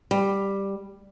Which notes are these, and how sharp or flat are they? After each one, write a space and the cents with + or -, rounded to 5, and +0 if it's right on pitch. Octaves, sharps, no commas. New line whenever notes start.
G3 +5